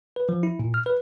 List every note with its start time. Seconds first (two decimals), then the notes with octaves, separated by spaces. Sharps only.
0.16 B4
0.29 F3
0.43 E4
0.59 A#2
0.74 F6
0.86 B4